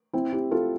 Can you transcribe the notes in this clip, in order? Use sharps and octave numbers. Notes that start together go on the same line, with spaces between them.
C4 E4
E4 G4
F4 A4